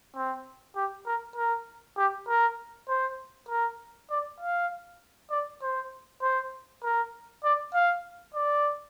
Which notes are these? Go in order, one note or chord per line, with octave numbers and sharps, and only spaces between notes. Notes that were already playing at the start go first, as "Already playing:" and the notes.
C4
G4
A#4
A#4
G4
A#4
C5
A#4
D5
F5
D5
C5
C5
A#4
D5
F5
D5